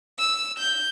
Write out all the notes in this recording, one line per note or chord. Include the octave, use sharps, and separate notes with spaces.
E6
G6